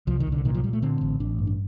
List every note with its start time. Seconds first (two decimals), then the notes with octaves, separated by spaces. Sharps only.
0.07 C2 F3
0.20 D#3
0.27 C2
0.32 D3
0.45 A#2 D#3
0.54 F3
0.63 A#2 G3
0.73 A3
0.82 D3 C4
1.01 A1
1.20 A1 D4
1.38 G2
1.47 D4